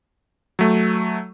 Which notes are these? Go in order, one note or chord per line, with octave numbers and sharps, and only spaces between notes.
F#3 A3